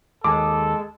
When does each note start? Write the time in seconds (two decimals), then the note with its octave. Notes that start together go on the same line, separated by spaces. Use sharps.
0.24 D#2 G#3 A4 D6